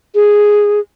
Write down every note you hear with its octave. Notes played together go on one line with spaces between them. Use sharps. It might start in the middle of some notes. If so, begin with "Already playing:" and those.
G#4